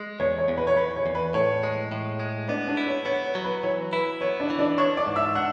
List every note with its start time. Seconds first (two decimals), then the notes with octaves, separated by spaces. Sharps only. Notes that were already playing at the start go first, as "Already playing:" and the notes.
Already playing: G#3
0.20 E2 C#5
0.38 C#5
0.48 E2
0.57 B4
0.67 C#5
0.77 E2 B4
0.96 C#5
1.06 E2
1.15 B4
1.34 A2 C#5
1.63 G#3
1.91 A2
2.20 G#3
2.48 B3 D4 D5
2.68 D4 D5
2.77 E4
2.87 C#5
3.06 B3 C#5
3.25 C#5
3.35 F#3
3.44 B4
3.63 E3 C#5
3.92 E4 B4
4.21 B3 C#5
4.40 D4 D5
4.50 E3
4.59 D4 D5
4.78 D4 C#5 C#6
4.97 D5 D6
5.06 G#2
5.16 E5 E6
5.35 D4 F#5 F#6